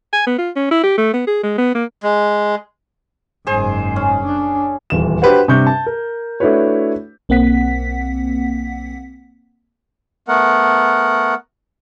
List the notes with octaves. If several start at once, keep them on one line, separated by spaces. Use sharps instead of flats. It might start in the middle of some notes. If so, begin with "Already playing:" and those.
G#5
B3
F4
C#4
E4
G4
A3
B3
G#4
G#3
B3
A#3
G#3
F#1 G#2 G#4 C5
C#4
D4
D#1 E2 E7
D4 F#4 G4 B4 C5 F#5
G2 C3 D4 C#6 G6
A5
A#4
A3 D4 E4 F#4 B4 C#5
B1 A#3 C4 F#5 B6
A3 B3 A#4 F#5